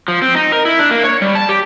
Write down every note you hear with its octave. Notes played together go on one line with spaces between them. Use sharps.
F3
C4
D#4
A#4
E4
D4
A#3
C#5
G3
A5
G4